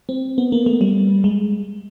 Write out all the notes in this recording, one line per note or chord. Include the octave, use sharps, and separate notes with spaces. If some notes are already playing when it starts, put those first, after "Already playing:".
C4
B3
A#3
A3
G3
G#3